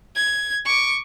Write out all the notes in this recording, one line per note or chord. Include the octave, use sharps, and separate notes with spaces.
G#6
C#6 D6